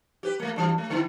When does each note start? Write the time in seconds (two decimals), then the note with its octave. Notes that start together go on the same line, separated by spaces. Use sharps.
0.23 G4 B4
0.40 A3 A#3
0.56 G2 E3
0.78 A3
0.90 D3 B3 E4